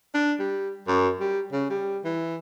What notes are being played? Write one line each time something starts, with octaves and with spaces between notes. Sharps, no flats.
D4
G3
F#2
G3
C#3
G3
E3